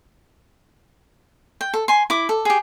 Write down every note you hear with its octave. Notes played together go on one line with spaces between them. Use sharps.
G5
A4
G#5 C6
E4 D6
A4
G4 G#4